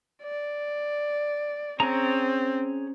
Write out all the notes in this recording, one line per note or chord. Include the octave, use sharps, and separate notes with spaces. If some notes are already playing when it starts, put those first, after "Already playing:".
D5
C4 C#4 G#4 A#5